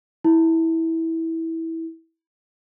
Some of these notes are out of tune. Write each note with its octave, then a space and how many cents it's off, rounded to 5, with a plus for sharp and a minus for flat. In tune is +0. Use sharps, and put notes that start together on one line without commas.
E4 -15